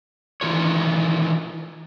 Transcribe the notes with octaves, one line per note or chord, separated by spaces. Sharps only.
D#3 E3 F4 C#5